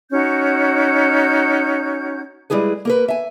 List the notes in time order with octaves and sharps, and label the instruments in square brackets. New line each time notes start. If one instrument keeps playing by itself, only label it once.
[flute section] C#4 D#4 F#4 G6
[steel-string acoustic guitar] G3 G#3 E4 G#4 B4
A#3 A#4 B4
E5 G#5